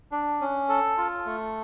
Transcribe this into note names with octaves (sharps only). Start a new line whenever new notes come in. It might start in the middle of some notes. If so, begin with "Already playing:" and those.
D4
C#4
A4
F4
A3